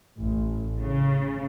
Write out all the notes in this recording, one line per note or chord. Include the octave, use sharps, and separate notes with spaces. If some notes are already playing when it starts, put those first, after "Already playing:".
A1
C#3